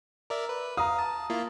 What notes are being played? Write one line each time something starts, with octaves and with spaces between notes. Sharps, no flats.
A#4 D5 E5
B4
F5 A#5 D#6
A5
A#3 E4 F4